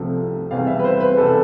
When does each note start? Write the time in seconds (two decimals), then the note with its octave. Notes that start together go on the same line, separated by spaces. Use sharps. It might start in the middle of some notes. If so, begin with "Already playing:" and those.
Already playing: C2 C3 F3 A3
0.51 E2 C3 G3 F5
0.67 E5
0.79 B4
0.84 C5
1.00 B4
1.17 E2 C3 G3 A4